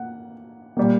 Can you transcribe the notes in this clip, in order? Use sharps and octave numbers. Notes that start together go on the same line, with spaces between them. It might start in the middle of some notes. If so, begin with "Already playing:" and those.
Already playing: A#3 F#5
A#2 G3 A#3